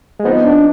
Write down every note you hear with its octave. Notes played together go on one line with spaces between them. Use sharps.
G#3
F3 B3 C4 D#4
D4